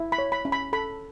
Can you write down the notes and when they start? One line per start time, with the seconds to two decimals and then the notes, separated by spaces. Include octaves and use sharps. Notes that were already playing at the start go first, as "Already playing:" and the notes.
Already playing: E4
0.12 B5
0.18 C#5
0.32 B5
0.45 C#4
0.52 B5
0.73 A4 B5